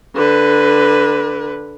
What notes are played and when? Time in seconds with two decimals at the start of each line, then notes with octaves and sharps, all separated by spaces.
0.15 D3 B4